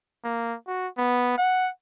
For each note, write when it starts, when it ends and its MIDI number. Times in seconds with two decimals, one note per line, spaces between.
0.25 0.56 58
0.67 0.88 66
0.98 1.36 59
1.38 1.70 78